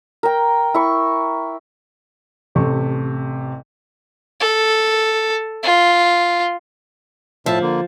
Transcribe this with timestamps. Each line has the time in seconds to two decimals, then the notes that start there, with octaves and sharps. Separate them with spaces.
0.23 A#4 G5
0.74 E4 C#6
2.55 A1 C3 A3 C#6
4.40 A4
5.63 F4
7.46 A2 F3 E5 A5
7.62 D3 A#3